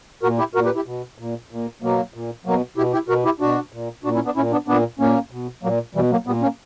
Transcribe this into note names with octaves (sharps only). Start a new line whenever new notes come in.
A#2 F#4 A#4
E4 G4
A#2 F#4 A#4
G4 B4
E4 G4
B2
A#2
A#2
B2 F#3 A#3
A#2
B2 F#3 A#3
B2 E4 G4
E4 G4
B2 F#4 A#4
E4 G4
B2 D4 F#4
A#2
A#2 D4 F#4
C#4 E4
B3 D4
A#2 C#4 E4
B3 D4
A#2 B3 D4
A#2 A#3 C#4
B2
A#2 F#3 A#3
B2 E3 G3
F#3 A#3
A#2 G3 B3
A#3 C#4